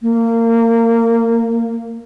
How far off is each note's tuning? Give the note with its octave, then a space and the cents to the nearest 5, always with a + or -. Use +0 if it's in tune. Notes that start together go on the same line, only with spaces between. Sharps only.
A#3 -25